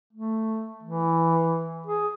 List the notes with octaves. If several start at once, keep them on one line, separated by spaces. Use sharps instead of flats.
A3
E3
G#4